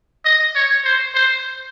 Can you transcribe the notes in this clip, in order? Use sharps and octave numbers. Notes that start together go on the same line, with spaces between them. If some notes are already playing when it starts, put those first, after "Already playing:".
D#5
C#5
C5
C5